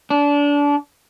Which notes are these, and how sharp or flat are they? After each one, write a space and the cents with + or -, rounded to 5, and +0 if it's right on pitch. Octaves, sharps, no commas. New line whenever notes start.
D4 -25